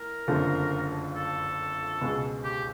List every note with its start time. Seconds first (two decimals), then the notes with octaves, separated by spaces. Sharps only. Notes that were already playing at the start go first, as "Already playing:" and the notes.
Already playing: A2 A#4
0.27 F#1 F2 D3 F3 A3
1.15 A4
2.01 C#2 B2 G#3 B3
2.44 G4